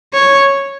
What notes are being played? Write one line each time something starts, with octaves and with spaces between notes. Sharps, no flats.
C#5